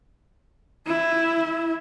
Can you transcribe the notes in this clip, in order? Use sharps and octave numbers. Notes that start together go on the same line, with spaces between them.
E4